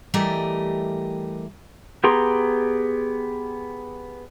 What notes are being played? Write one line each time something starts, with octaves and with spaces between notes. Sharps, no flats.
E3 G3 A3 G4 A#4 D#5
B3 G4 G#4 A#5 C6